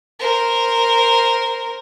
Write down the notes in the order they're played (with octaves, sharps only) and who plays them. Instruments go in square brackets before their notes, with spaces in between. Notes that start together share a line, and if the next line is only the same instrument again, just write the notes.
[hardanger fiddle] A#4 C5